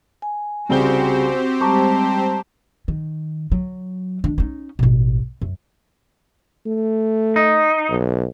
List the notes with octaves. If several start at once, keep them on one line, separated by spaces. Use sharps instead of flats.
G#5
C2 C#3 C4 F#4 G4 C5 G7
G3 G#3 A5 A#5 C#6 D6
D#3
F#3
D#3 D4
C#4 D#4
A1 B2
F#2
A3
D#4
B1